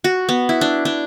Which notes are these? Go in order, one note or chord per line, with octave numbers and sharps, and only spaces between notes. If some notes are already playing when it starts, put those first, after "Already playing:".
F#4
B3
E4
D4
D4